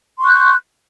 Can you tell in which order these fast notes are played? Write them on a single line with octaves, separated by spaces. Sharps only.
C6 C#6 F#6 G6